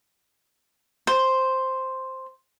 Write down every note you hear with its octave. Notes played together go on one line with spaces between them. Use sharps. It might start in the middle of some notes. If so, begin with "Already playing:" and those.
C5